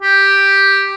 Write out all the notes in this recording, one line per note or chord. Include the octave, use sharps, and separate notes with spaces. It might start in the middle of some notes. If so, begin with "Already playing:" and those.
G4